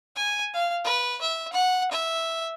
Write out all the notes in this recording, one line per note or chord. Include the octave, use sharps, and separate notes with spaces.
G#5
F5
B4
E5
F#5
E5